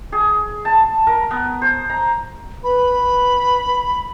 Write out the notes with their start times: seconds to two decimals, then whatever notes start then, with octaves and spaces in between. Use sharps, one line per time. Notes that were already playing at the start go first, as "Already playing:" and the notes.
0.12 G#4
0.65 A5
1.07 A#4
1.31 B3
1.62 C5
1.89 A#5
2.63 B4 B5